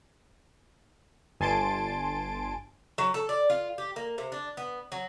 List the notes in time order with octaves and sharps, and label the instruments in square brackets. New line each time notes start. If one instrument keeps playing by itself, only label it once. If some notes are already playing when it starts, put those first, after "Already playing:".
[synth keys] G1 G#5 A5 C6 A6 D7
[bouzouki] F#3
A4
D5
F4
G4
A#3
C3
D4
B3
F#3